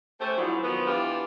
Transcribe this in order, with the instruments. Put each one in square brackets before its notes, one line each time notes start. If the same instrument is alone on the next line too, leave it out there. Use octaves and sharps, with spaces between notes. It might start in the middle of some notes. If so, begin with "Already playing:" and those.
[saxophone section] A3 C#4 G4 A4 C5
G#2 F3 F#3 B3 D4 E4
D#3 F3 F#3 B3
E3 B3 D4 F4 G4